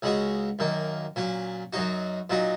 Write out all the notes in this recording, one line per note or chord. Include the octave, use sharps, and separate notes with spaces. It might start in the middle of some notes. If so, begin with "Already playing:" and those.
C#2 C#3 G#3 C#4 F#4
F#2 D#3 A#3
A#2 F#3 C#4
F#2 F#3 D#4 F#4
A#2 F#3 D#4 F#4